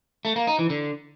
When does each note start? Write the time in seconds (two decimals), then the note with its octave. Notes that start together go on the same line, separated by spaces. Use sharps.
0.25 A3
0.36 A#3
0.47 D#4
0.59 E3
0.70 D3